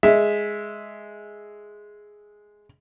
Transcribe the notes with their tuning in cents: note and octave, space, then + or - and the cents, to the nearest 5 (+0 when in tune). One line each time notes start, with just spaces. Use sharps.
G#3 +0 E5 +0